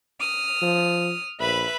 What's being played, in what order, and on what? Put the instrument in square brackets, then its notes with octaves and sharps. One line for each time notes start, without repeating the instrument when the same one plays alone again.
[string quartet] D#6 F6
[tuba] F3
[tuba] A#1 [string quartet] B4 E5 B5